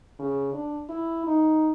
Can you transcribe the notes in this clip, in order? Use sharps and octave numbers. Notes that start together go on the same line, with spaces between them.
C#3
D4
E4
D#4